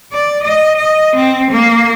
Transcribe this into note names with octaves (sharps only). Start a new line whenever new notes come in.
D5
D#5
D#5
C4
A#3